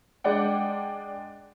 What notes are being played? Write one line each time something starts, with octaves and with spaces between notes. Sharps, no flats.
G#3 D4 D5 F#5 G5